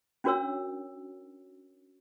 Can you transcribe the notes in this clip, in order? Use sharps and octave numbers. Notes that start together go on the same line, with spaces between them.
C#4 D4 F#4 A#4 C#5 E6